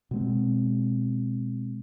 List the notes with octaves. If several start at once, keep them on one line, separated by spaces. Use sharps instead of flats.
B2 G#3 C4